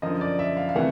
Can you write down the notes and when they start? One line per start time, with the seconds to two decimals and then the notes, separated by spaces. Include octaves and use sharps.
0.02 F#2 D3 F3 D#5
0.21 D5
0.39 E5
0.57 F5
0.69 F5
0.75 C3 E3 A3 F#5